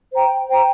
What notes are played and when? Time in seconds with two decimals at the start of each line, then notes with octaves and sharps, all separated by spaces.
0.13 C5 G5 A#5
0.49 C5 G5 A#5